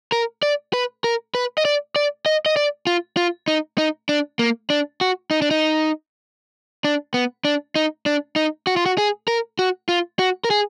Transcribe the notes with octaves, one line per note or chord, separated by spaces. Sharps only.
A#4
D5
B4
A#4
B4
D#5
D5
D5
D#5
D#5
D5
F4
F4
D#4
D#4
D4
A#3
D4
F#4
D#4
D4
D#4
D4
B3
D4
D#4
D4
D#4
F#4
F4
F#4
G#4
A#4
F#4
F4
F#4
A#4
G#4